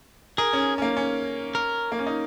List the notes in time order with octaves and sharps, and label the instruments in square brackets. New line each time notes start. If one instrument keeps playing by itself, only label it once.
[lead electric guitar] G#4 [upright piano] A#4
[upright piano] C#4
C#4
A#3
C#4
[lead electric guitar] A#4
[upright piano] A#3
C#4
D#4